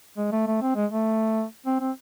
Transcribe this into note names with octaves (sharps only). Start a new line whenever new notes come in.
G#3
A3
A3
C4
G#3
A3
C4
C4